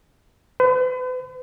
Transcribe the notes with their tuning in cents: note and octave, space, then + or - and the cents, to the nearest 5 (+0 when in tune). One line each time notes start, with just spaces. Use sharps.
B4 +45